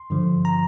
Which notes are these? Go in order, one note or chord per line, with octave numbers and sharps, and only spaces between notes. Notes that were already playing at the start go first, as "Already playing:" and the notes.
Already playing: C6
G2 D3 F3
A#5